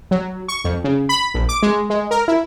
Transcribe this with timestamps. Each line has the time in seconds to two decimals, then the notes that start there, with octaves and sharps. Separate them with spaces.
0.11 F#3
0.48 C#6
0.64 F2
0.84 C#3
1.09 B5
1.34 A#1
1.49 D6
1.62 G#3
1.90 G#3
2.11 A#4
2.28 E4